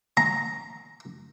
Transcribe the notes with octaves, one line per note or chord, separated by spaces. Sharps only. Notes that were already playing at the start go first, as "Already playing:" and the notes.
A#5